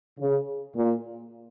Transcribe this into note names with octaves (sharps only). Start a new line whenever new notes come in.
C#3
A#2